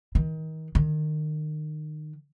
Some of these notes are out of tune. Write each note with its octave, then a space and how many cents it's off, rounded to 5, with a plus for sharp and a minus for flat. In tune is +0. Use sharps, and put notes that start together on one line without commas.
D#3 +30
D#3 -25